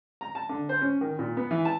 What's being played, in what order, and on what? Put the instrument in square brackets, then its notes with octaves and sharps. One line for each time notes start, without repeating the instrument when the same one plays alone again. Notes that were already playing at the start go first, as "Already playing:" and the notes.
[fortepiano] A#5
A5
D3
C5
C#4
D#3
A#2
B3
E3
A5